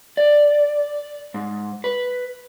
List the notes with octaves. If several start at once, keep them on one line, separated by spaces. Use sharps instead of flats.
D5
G#2
B4